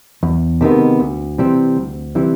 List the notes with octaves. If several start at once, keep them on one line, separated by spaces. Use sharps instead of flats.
E2
C3 D#3 G#3 B3
D2
C3 E3 G3 C4
D2
C3 E3 G3 C4